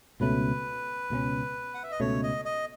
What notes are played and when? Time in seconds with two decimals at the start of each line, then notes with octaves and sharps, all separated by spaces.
0.20 C#2 B2 A3 C#4 B4
1.10 C#2 B2 A3 C#4
1.74 F#5
1.83 E5
1.91 D#5
2.00 C#2 B2 A3 C#4 C#5
2.23 D#5
2.45 D#5